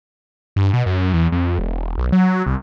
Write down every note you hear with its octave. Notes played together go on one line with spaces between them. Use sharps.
G2
B2
F#2
E2
F2
E1
B1
F#3
C2